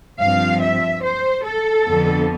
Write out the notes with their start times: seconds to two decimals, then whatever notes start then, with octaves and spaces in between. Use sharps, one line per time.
0.20 G2 F3 C4 F5
0.62 E5
1.03 C5
1.45 A4
1.86 F2 D3 F3 B3